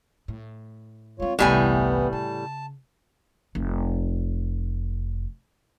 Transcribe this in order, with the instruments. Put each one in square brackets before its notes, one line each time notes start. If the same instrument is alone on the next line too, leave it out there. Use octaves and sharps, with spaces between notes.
[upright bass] A2
[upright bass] G#3 C4 [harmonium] F4 C#5
[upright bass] G1 C2 [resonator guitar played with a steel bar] A2 G3 G#5 [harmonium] E3 B3
[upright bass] C#3 [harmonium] A5
[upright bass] F1 F4